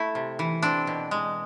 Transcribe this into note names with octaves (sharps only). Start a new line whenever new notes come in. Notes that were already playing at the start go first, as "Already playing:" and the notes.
Already playing: A3 E4
C3
E3
C4 D4
B2
G#3